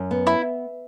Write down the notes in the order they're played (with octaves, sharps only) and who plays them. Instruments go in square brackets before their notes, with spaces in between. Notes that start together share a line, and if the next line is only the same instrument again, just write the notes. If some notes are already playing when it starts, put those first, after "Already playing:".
Already playing: [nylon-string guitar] F#2
B3
[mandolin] E4